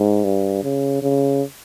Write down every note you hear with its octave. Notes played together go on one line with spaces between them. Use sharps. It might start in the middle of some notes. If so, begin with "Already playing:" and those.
Already playing: G#2
G2
C#3
C#3